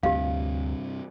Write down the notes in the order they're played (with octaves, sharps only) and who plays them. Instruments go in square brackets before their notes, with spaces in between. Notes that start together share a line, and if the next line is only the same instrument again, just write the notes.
[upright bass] D2 [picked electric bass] G2 C3 [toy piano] G4 D#5 F5